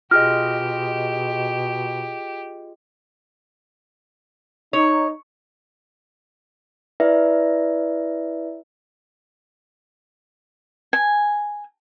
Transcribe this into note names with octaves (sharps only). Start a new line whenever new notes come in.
B2 F4 G4 G#4 D#5 F6
D#4 C#5
E4 B4 D5 E5
G#5